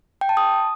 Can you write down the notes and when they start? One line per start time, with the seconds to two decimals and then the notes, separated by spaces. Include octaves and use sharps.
0.21 G5
0.29 A5
0.37 D#6